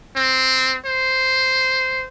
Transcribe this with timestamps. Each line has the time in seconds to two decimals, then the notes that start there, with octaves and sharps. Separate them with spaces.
0.16 C4
0.85 C5